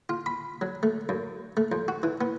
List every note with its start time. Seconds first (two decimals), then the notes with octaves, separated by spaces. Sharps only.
0.09 F4
0.26 B5
0.61 F#3
0.83 A3
1.09 F#2
1.57 A3
1.72 F2
1.88 F#4
2.03 E3
2.21 B3